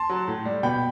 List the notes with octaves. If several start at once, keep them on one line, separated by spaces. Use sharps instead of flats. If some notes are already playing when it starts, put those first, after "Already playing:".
Already playing: A5 C6
F#3
A2
G3
B2 G5 B5